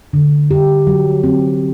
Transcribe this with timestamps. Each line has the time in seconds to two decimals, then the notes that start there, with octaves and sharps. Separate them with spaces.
0.13 D3
0.51 G4
0.87 F#3
1.24 C4